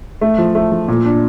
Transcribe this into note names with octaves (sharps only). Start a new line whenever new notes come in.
A3
F3
A3
F3
A#2
D4